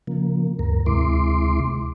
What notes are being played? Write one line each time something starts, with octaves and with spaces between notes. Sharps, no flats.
C#3 F3 A#3
D2 G2 A#4
D2 C3 G#3 E4 C6 D6